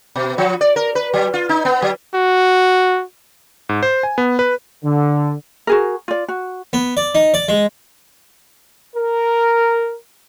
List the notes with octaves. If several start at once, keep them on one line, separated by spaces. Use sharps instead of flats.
B2
F3
D5
A#4
B4
F#3
F4
D#4
B3
F#3
F#4
G#2
C5
G#5
B3
B4
D3
F#4 G#4 A#4
F4 D5
F#4
B3
D5
D#4
D5
G#3
A#4